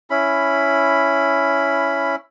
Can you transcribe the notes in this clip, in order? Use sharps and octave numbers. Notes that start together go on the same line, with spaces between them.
C#4 E4 B5